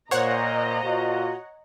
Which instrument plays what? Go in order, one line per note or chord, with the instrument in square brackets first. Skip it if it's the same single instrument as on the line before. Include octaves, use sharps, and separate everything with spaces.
[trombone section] A#2 [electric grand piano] C5 [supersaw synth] C#5 F#5 [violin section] D#5 A#5
[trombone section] A#2 F4 F#4